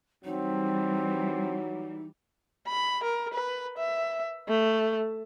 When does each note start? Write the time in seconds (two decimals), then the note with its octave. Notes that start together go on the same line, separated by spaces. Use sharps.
0.25 E3 F#3 G3 C4 D#4
2.67 B5
3.04 A#4
3.34 B4
3.78 E5
4.48 A3